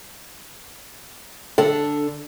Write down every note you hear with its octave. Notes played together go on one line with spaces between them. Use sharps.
D3 D4 A4